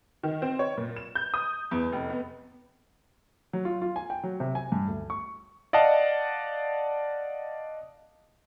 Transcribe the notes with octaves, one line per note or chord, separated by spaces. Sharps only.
D#3
C4
C#5
A#2
E7
G6
D#6
E2
F1
B3
F#3
F4
F4
G#5
G5
F#3
C3
G#5
G2
D2
C#6
D5 D#5 F5 F#5 A5